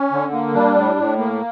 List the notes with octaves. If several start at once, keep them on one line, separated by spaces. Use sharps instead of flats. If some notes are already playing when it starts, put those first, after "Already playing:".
Already playing: C#4
D3
A#3
G3 D4
A2
A2
A#3